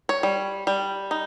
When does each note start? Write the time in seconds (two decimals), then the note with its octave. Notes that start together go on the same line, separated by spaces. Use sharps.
0.09 C#5
0.23 G3
0.67 G3
1.11 D#4